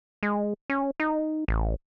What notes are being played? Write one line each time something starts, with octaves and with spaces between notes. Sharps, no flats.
G#3
C#4
D#4
A1